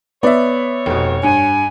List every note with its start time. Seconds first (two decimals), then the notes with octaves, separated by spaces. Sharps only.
0.23 B3 C#5 D5 E5
0.86 F1 B2
1.23 G2 G#5